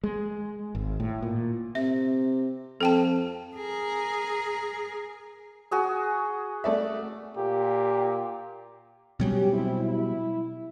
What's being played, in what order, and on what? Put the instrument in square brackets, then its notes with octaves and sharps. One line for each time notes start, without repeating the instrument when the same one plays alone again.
[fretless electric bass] G#3
G#1
A2
A#2
[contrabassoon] C3 [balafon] E5
[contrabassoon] F2 [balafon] A4 G5 A5
[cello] G#4 A#4
[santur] F#4 G#4 D#5
[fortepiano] A3 D5 E5
[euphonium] A#2 [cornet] G4
[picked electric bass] B2 F#3 G3 [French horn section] C#4 G4
[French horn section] C4 E4
E4